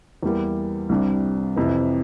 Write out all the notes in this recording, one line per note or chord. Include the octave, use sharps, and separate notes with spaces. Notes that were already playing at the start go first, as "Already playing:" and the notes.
E2 E3 G3 A#3
C2 C3 G3 D4
F2 C3 E3